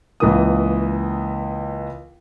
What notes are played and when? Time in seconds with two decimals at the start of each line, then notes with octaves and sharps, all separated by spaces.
0.20 C#2 E3 A#3 D#6